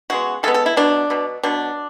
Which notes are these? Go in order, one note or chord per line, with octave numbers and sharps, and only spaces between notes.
C#3 G#3 B3 F#4
C#3 G#3 B3 A4
A4
E4
B2 F#3 B3 D4
B2 F#3 B3
B2 F#3 B3 D4